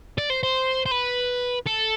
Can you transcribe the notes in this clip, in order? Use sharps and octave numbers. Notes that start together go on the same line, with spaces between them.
D5
C5
C5
C5
B4
A4